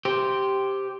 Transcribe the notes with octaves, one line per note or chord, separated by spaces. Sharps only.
G4 C5